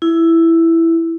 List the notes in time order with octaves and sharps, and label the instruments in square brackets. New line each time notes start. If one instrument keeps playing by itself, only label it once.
[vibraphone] E4